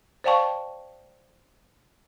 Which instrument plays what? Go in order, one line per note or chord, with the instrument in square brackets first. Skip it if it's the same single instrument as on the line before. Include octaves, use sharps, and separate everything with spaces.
[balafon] C5 D5 F5 G5 A5 C#6